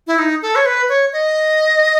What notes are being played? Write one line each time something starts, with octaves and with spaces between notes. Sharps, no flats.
E4
D#4
A4
C#5
B4
C#5
D#5